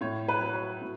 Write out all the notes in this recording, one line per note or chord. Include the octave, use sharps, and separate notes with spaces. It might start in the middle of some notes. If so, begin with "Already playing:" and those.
A2 C#5
B4
F#3
B4
A2